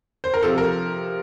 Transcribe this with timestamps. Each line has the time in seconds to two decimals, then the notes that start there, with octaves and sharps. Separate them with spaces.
0.24 C5
0.34 A#4
0.43 C3 F3 A4
0.58 A#4